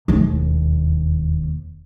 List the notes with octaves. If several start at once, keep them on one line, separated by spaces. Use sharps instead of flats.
E1 D#2